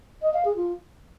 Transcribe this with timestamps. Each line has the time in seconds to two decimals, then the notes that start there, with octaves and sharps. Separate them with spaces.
0.22 D#5
0.34 F5
0.45 G#4
0.56 F4